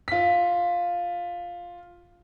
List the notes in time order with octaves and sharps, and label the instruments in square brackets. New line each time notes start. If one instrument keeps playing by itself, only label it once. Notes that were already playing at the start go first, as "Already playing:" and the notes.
[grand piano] F4 B6